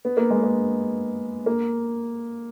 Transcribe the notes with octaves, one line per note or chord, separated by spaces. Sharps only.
B3
A#3
G#3
A#3
A#3